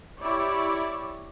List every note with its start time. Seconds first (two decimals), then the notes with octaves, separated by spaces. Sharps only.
0.21 E4 G4 C#5 D5